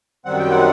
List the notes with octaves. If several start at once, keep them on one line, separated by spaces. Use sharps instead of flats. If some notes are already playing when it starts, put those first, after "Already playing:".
F#2 D#3 G3 C4 F#5
G5
F#5